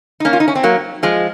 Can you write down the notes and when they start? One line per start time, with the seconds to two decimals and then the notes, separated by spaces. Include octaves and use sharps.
0.20 D#4
0.25 A#3 C#4
0.33 F4
0.40 D#4
0.48 C#4
0.55 C4
0.63 F#3 A#3
1.03 F3 G#3